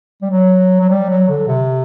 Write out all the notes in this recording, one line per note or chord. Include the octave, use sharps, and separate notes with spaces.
G3
F#3
F#3
G3
F#3
D3
C3